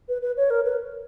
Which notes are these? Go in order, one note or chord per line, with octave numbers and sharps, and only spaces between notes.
B4
B4
C#5
A#4
B4